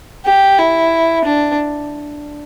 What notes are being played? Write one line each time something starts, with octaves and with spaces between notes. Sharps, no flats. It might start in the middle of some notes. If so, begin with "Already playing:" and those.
G4
E4
D4